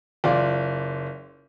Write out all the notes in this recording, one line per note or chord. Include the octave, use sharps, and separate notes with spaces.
F#1 F4 D5